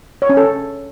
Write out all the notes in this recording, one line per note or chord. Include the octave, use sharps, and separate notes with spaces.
C#5
C#4
A4